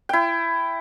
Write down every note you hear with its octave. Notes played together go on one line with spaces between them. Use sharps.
E4 G5